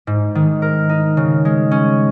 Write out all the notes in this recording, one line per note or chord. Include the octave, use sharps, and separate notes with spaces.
G#2
D#3
A#4
D#4
C#3
G#3
C#4